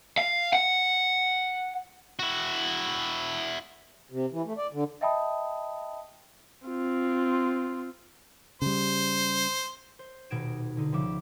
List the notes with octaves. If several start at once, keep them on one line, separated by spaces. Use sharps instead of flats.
F5
F#5
E4 F#4
C3
E3
A3
D5
D3
D#5 E5 G5 A5 B5 D#6
C4 F4
C#3 G3 C5
C5
D#1 B2 D#4 G#6 D7 E7
D3 D#4
C#2 F3 E5 D6 D7